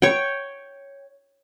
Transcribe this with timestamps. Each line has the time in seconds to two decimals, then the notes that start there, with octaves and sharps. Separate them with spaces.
0.02 C#5 G5